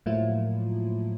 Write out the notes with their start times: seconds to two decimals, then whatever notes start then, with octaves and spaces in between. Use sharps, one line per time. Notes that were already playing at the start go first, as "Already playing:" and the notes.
0.06 A2 F3 F#3 A#3 E4 F4